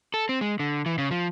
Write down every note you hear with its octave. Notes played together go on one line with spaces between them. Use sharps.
A4
C4
G#3
D3
E3
C#3
F3